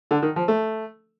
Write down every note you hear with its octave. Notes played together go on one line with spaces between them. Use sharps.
D3
D#3
F3
A3